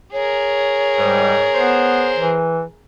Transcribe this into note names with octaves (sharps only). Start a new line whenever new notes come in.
G#4 A#4 C#5
G#2 G3
B3 C5
E3